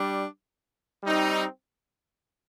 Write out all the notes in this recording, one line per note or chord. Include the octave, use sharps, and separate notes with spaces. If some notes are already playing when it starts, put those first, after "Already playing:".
Already playing: G3 D4
G3 C4 D#4